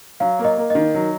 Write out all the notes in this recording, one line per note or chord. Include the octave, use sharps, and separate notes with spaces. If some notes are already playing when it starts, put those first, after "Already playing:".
F#3 F5
A#3
D#5
A#3
D#3 D#5
F#3